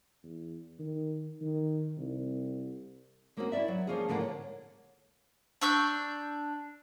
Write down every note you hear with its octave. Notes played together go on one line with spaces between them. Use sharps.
E2
D#3
D#3
C2
G#3 A#3 C4 C#4 D#4 F#4
E4 F#4 D5 E5
F#3
F3 A#3 C#4 F4 G#4
A2 D3 A#3 D5 F#5
C#5
D4 C#6 E6 G6